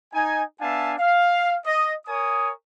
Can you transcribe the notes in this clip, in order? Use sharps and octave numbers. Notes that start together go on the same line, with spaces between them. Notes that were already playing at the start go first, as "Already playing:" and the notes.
D#4 G#5
B3 D4 E5 F5 G#5 A5
F5
D#5
A#4 C#5 G#5 D#6